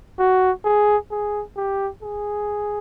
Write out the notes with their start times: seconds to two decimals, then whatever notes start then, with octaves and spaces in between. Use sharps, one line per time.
0.19 F#4
0.64 G#4
1.11 G#4
1.56 G4
2.02 G#4